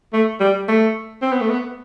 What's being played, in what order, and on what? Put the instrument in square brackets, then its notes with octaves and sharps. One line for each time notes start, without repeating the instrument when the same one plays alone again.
[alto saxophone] A3
G3
A3
C4
B3
A3
B3